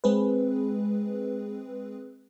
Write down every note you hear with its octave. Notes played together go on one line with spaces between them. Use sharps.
G#3 C4 G#4 B4